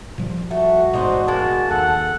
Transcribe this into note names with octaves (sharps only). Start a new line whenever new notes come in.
A#2 F3 G3
A3 F#4
A1 G#2 B2 D4 D#4 C5
G#3 A#3 A5
D#2 A4 F#5